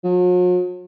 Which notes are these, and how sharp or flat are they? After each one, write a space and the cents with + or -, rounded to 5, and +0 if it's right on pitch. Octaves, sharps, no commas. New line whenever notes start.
F#3 -45